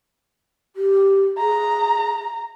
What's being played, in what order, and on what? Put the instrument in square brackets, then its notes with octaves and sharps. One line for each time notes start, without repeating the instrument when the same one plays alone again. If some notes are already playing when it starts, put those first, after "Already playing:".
[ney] G4
[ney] G#4 [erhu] A#5